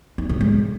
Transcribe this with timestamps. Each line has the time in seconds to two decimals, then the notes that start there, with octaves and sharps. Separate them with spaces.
0.18 D#4
0.29 D3
0.41 G#3